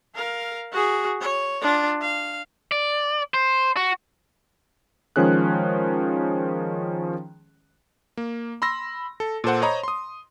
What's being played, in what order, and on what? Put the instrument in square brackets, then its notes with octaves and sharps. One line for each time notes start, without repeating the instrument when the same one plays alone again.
[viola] A#4 F5
F#4 G#4
C#5
D4 F4
F5
[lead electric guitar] D5
C5
F#4
[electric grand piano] D#3 F3 G#3 C#4 G#4 F#6
A#3
B5 C6 E6 A#6
A4
A#2 A4 C5 F#5
C5 C#5 D#5 A#5 B5
C6 D#6